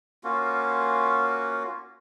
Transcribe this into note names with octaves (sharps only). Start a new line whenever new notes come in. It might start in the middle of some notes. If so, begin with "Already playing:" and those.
A#3 C#4 F4 F#4